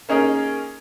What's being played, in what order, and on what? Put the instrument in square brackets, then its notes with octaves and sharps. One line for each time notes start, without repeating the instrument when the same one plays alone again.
[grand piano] A#3 C#4 D#4 G#4 A#4